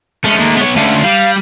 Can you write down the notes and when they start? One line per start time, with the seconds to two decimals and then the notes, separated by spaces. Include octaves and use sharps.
0.24 G#3 A3 C#4
0.40 D#3 A#3
0.57 B3 C#5
0.76 D3 A3 C#4 F4
1.04 G3 F5